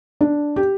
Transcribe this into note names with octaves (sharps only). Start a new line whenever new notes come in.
D4
G4